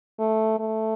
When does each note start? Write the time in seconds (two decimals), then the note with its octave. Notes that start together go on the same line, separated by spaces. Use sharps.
0.19 A3
0.59 A3